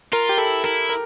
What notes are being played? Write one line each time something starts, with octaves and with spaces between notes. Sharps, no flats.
F4 A#4
G4
E4 A4
E4 A#4
A#4